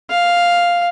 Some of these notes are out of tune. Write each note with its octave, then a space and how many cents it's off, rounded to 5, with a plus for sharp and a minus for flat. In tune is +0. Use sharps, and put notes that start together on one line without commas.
F5 +0